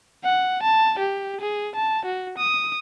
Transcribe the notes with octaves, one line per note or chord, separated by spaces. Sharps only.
F#5
A5
G4
G#4
A5
F#4
D#6